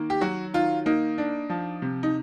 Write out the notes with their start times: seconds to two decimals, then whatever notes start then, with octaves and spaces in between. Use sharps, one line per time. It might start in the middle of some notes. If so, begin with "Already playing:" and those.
Already playing: D#3 A#3
0.10 G4
0.21 F#3 F#4
0.54 D#3 F4
0.86 A#3 D#4
1.18 D4
1.50 F3
1.82 C3
2.03 D#4